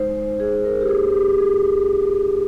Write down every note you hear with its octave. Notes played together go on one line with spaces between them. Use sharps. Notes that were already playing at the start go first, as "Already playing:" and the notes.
Already playing: G#3 D#4 C5
G#3
D#4 G#4
D#4 A#4
G4
A#3 G#4
A#3 G4
F4 G#4